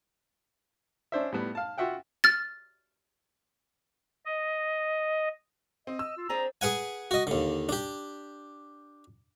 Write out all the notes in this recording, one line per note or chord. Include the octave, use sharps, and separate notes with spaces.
C#4 D4 C5 E5
A2 G3 B3
F5 A5
F4 F#4 E5 F#5 G5
F6 A6
D#5
C4 D#5
E6
F4
C4 D4 G#4 A#5
G#4 B4 F#5 G#5
F#4 D#5
D#2 D3
D4 G4